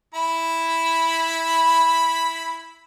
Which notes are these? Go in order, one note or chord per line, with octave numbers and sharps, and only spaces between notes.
E4 B5